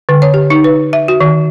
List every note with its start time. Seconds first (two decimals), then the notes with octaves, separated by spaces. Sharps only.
0.09 D3
0.22 C#5
0.34 G4
0.50 D#4
0.64 B4
0.93 E5
1.08 F#4
1.20 D#3